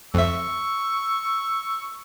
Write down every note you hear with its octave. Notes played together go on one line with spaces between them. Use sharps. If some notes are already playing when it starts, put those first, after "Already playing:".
F2 E5 C#6 E6